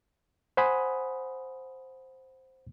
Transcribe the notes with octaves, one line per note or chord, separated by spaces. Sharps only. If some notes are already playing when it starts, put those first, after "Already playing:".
C5 F#5 G#5 B5 D#6